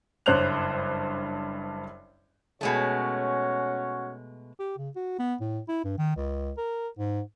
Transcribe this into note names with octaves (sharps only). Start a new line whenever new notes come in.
F#1 G2 C5 C#5 F#6 F7
B2 G#3 A3 C#4 F#4 C#5
G4
C#3
F#4
B3
A2
E4
G2
D#3
C#2
A#4
G#2